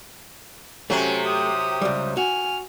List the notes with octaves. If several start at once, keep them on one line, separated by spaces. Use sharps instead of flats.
C3 F#3 A3 C#4
G4 D#6
C#2 G3
F#4 G#5 F6